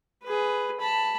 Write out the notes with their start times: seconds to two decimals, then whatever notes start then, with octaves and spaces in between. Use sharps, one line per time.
0.24 G#4 B4
0.80 A5 B5